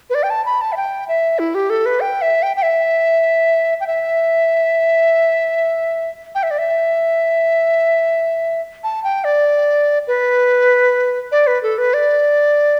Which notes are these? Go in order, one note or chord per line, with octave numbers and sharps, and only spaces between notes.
B4
D5
G5
A5
B5
A5
E5
G5
E5
E4
G4
A4
B4
G5
E5
G5
G5
E5
G5
E5
G5
E5
D5
E5
A5
G5
D5
B4
D5
B4
A4
B4
D5